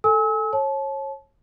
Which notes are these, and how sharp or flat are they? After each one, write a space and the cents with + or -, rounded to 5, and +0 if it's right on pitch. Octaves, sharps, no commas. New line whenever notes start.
A4 +0 G#5 +0 E6 -40
C#5 -30 A5 -30